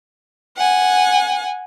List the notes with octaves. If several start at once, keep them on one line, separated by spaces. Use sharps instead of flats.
F#5 G#5